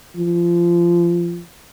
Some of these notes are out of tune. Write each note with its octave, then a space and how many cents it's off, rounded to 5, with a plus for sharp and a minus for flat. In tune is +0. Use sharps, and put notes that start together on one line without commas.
F3 -20